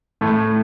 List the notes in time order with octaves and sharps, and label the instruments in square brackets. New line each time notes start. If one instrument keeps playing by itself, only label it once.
[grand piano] A2 A3